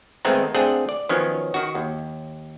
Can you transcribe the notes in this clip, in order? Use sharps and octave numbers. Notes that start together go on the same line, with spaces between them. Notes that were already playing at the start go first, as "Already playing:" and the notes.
D#3 G#3 A3 B3 C4 D#4
A3 C4 D4 G#4 F#5
D5
D#3 F3 F#3 B3 C#4
D#3 F#4
D#2